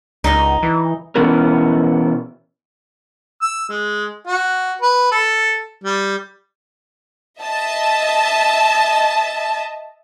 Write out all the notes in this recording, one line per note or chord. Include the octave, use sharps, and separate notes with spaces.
C#2 D#4 D#5
E3
B2 E3 B3 C#4 E4 A#4
E6
G#3
F#4
B4
A4
G3
D#5 E5 A5